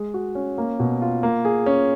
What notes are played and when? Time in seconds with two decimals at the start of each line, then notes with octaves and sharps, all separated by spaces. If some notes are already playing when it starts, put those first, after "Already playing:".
Already playing: G#3
0.14 F#4
0.35 C#4
0.58 A#3
0.80 B2
1.02 F4
1.23 A#3
1.45 G#4
1.66 C#4